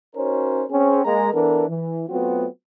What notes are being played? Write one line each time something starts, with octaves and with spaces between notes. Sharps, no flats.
C#4 D#4 F#4 A#4 C5 C#5
C4 C#4 G#4
G#3 A#3 A#5
E3 B3 D4 A4 A#4
E3
F#3 A3 B3 C4 F4 F#4